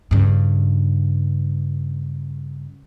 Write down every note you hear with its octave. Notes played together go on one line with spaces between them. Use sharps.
G2 C#3